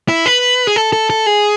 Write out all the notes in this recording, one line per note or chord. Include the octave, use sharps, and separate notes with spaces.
E4
B4
G#4
A4
A4
A4
G#4